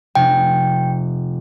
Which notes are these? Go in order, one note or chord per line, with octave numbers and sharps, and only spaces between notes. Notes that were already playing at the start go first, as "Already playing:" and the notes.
F1 G5